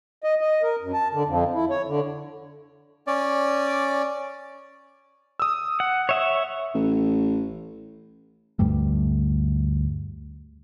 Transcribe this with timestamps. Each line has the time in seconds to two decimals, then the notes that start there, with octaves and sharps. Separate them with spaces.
0.24 D#5
0.41 D#5
0.63 A#4
0.82 F#2
0.94 A5
1.13 D3
1.26 F2
1.54 E4
1.70 C#5
1.88 D3
3.07 C#4 D5
5.40 D#6 E6
5.80 F#5
6.09 C#5 E5 F#5
6.74 A1
8.59 D2 G2 G3 A3